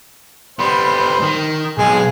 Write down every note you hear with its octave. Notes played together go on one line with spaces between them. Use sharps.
G3 B3 C5
D#3
B1 G#3 G#4